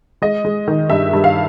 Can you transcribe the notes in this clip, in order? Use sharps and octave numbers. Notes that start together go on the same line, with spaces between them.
G#3 D#5
G#3
D#3
G2 E5
G2
F5